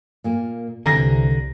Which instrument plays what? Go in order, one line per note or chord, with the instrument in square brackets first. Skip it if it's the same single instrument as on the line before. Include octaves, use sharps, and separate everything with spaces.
[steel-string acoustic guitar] A#2 A#3
[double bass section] C2 [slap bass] D3 [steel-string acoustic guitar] E3 G3 C4 [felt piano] A#5 A#6